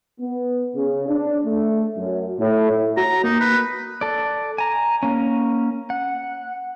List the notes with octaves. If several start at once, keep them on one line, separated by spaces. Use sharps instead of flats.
B3
C#3
D4
A3
F#2
A2
F#4 A#5
A#3 D#4
B4
A4 D5
G#5 A#5
A#3 C#4
F#5